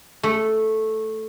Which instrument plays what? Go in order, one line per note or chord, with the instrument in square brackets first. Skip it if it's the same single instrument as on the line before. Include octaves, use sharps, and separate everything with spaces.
[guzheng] A3